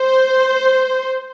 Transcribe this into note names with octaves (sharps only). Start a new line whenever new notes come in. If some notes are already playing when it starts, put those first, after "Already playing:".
Already playing: C5